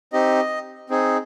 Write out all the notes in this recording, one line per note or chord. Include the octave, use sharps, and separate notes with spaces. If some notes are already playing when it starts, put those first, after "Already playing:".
C4 D#4 G4 D#5
C4 D#4 G#4